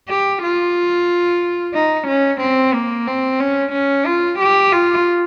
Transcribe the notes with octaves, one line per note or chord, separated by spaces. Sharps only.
G4
F4
D#4
C#4
C4
A#3
C4
C#4
C#4
F4
G4
F4